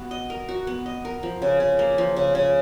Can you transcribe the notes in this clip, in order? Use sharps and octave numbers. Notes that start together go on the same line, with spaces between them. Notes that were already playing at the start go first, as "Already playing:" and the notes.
Already playing: B3 F#4
D#5
A#4
F#4
B3
D#5
A#4
F3
C#3
C#3
A#3
F3
C#3
C#3